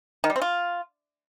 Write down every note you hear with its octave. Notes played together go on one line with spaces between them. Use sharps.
D#3
G3
C4
F4